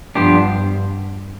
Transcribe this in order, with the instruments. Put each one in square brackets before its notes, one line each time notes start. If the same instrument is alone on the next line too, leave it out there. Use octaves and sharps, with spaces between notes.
[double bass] G2 [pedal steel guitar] F3 B3 D4 G4 C5